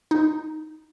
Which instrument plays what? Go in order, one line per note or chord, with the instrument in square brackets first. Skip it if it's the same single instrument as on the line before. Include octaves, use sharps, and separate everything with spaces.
[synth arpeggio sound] D#4